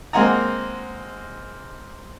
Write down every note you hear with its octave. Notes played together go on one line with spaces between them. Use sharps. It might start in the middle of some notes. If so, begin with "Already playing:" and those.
G#3 A#3 C4 F#5 G#5 A#5